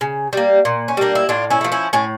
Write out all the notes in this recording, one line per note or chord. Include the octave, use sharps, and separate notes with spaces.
C#3
G3 A#3
A#2
C#4
G3 A#3 D4
E4
A2 D4 F4
C#4 E4
F3 A3
C#4 E4
A2 C#4